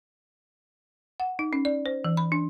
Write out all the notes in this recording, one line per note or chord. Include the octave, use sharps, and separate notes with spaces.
F#5
D#4
C#4
D5
C5
E3
B5
D4